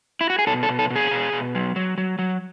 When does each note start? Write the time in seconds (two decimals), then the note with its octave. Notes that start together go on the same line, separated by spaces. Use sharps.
0.21 E4
0.30 F#4
0.39 G#4
0.47 B2 A4
0.63 A4
0.69 B2
0.79 A4
0.90 B2
0.96 G#4
1.11 B2
1.33 B2
1.55 F#3
1.76 F#3
1.98 F#3
2.19 F#3